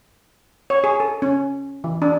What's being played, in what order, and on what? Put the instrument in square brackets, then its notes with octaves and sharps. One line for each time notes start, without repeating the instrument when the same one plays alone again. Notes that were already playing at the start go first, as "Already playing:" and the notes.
[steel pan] C#5
G#4
A4
C#4
E3
D4